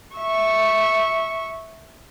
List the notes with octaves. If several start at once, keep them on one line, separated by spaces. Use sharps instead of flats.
E5 C#6